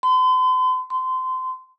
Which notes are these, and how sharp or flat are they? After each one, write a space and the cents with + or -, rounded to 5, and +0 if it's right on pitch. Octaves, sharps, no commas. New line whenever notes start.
C6 -45
C6 -25